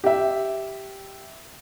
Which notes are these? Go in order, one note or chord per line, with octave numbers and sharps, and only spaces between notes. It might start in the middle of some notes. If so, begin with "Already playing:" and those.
G4 E5